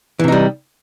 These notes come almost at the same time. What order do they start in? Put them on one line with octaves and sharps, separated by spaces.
E3 C3 D#4 G3